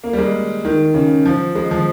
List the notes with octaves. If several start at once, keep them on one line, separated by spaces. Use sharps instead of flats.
A#3
G3
G#3
D#3
C#3
F3
G#3
F3